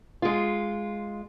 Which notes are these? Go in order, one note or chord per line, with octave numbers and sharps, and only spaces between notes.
G#3 F4